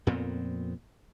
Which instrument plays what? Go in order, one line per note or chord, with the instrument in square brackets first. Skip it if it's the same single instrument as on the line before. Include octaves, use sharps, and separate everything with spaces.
[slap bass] F2 A#2 B3 C4